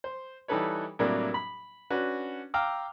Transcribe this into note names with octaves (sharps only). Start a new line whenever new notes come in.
C5
E3 G3 D#4 A4 B4 C#5
A2 C3 F#3 G3 A#3 D4
B5
C#4 D4 F#4 B4
F5 G5 A#5 D6 E6 F6